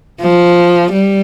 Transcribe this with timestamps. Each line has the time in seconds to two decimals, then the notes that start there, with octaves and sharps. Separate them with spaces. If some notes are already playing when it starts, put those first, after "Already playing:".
0.21 F3
0.92 G3